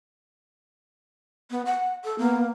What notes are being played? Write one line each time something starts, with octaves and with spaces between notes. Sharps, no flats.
B3
F#5
A4
A#3 B3